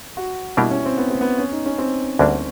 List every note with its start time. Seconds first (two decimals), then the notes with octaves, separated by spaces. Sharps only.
0.17 F#4
0.57 B2 G3 A#3 D4 E4 G4
0.71 C#4
0.85 C4
0.98 B3
1.10 C4
1.21 B3
1.38 C#4
1.52 D#4
1.66 C#4
1.78 C4
2.19 D2 D3 G3 A#3 D4